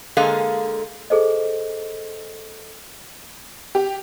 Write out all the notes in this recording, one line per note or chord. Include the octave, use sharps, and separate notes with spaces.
D3 G#3 A#3 G#4 A4 F5
G#4 A4 C5 D#5
G4